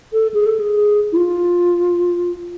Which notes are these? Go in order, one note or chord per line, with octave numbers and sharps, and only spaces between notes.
A4
G#4
A4
G#4
E4
F4